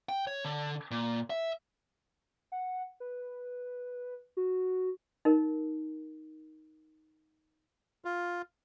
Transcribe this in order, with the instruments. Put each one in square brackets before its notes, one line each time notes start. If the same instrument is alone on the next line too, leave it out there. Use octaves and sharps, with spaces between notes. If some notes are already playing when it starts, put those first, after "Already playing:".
[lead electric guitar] G5
C#5
D3
A#2
E5
[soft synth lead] F#5
B4
F#4
[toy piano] D#4 A#4
[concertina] F4